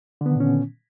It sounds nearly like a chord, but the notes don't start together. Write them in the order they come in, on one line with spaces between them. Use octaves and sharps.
D3 B3 D#3 A#2 C#4